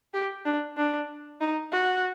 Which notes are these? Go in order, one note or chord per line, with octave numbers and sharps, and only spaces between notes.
G4
D4
D4
D#4
F#4